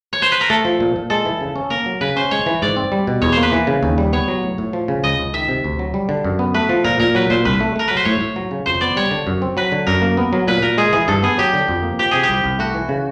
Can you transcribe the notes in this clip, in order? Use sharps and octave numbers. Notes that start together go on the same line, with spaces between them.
C#5
C5
B4
A#4
A3 A4
F3
A#2
A#2
G#3 A4
E3
C#3
C#4
A#3 A#4
F#3
C#3 B4
C#4 C5
G#3 C#5
E3
G#2 D5
C4
G3
B2
E2 C#5
A#3 C5
B4
E3
C#3
D#2
G3
B3 C#5
F#3
A2
A2
F3
C#3
C#2 D#5
C#2
D#3 E5
C3
D2
F#3
G3
D3
F#2
B3
A3 B4
F3
A#2 A#4
A#2 A#4
F#3 B4
A#2 C5
C2 B4
A3
A3 A#4
F#3 B4
C5
A2 C#5
A2
F#3
C#3
F2 C5
B3 D5
G3 C#5
D3
F#2
C4
F#3 B4
D3
F#2 A#4
A#3
B3
F#3
A#2 B4
A#2 A#4
G#3 G#4
E3 G#4
G2 A4
B3 G#4
F#3 G4
D3
F2
A#3
F3 G4
C3 G#4
G4
C2
C2
A3 F#4
E3
C#3